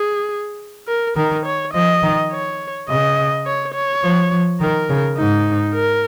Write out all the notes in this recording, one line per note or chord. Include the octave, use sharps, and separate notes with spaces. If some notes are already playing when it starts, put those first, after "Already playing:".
Already playing: G#4
A#4
D#3 A#4
C#5
F3 D#5
D#3
C#5
C#3 D#5
C#5
C#5
F3
F3
D#3 A#4
C#3
G#2 D#4
A#4